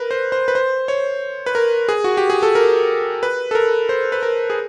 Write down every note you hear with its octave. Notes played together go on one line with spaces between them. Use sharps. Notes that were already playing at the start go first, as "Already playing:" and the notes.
Already playing: A#4 B4
C5
C5
B4
C5
C#5
B4
A#4
G#4
F#4
G4
G#4
A4
A#4
B4
A4
A#4
C5
B4
A#4
G#4